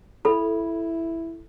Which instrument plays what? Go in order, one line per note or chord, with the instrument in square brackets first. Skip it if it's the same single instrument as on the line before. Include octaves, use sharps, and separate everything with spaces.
[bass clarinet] E4 [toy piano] A4 B5